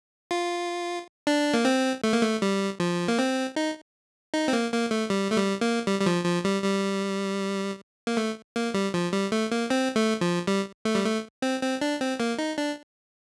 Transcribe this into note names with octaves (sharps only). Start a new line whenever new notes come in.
F4
D4
A#3
C4
A3
A#3
A3
G3
F3
A#3
C4
D#4
D#4
C4
A#3
A#3
A3
G3
A3
G3
A#3
G3
G3
F3
F3
G3
G3
A#3
A3
A#3
G3
F3
G3
A3
A#3
C4
A3
F3
G3
A3
G3
A3
C4
C4
D4
C4
A#3
D#4
D4